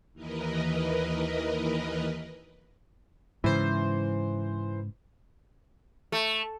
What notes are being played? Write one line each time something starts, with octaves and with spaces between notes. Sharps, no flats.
D#2 E3 A#4 B4 D#5
G#2 C#3 E3 C5
A3